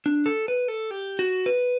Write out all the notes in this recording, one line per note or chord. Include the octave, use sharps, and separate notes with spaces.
D4
A4
B4
A4
G4
F#4
B4